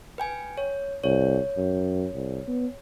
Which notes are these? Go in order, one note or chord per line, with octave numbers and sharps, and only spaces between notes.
B4 G5 G#5
C#5
C2 C#5
F#2
C2
B3